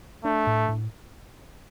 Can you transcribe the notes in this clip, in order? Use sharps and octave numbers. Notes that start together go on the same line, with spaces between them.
A3 D4
A2
A2